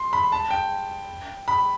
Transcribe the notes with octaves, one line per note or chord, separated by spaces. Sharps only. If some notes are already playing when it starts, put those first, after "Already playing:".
Already playing: C6
B5
A5
G5
B5